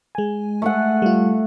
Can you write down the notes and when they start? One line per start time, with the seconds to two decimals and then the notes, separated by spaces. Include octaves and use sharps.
0.15 G#3 G#5
0.62 A3 A4 F#5
1.02 G3 F4